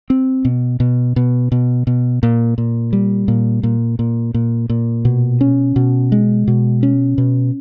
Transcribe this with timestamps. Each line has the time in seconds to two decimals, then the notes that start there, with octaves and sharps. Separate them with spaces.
0.10 C4
0.45 B2
0.80 B2
1.16 B2
1.52 B2
1.87 B2
2.23 A#2
2.58 A#2
2.93 G3
3.28 A#2
3.63 A#2
3.99 A#2
4.34 A#2
4.69 A#2
5.05 B2
5.41 C#4
5.76 B2
6.12 G#3
6.48 B2
6.83 C#4
7.18 B2